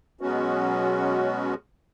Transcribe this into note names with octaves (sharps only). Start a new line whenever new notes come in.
B2 F#3 G#3 B3 C#4 F#4